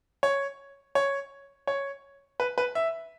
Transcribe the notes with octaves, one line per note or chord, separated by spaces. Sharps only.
C#5
C#5
C#5
B4
B4
E5